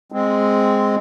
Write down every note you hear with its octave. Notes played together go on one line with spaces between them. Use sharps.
G#3 C4